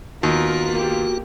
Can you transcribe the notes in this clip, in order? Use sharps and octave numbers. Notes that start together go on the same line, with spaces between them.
D#2 B3 F4 F#4 A#4
A#3 G4